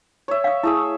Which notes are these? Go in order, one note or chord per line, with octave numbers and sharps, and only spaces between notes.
C#5 E5
F5 D#6
A3 E4 G#4 E6